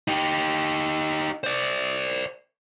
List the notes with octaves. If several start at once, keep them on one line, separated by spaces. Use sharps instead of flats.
D#4 G4
C5 D5